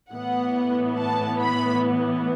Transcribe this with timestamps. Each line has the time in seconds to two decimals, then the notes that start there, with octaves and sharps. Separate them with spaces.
0.11 A2 E3 B3 F#5
0.98 A5
1.41 B5